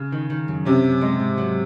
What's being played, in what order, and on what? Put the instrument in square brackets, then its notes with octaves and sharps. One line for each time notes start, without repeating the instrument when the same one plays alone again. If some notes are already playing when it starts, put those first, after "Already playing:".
Already playing: [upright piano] C#3
[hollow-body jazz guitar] D#3
D#3
F#2
[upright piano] C3 [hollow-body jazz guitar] C#4
[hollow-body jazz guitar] F#2
G#3
G#2
F#3